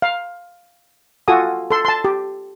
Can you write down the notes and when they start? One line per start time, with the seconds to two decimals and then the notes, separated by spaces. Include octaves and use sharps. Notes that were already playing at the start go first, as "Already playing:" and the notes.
0.02 F5
1.28 F4 F#4 A4 G#5 D#6
1.71 A4 C6
1.85 A5 C6
2.05 G4